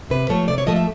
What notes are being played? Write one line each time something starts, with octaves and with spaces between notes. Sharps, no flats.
C3 B4
F3 A3 C#5
C3 D5
C#5
F3 A3 D#5
E5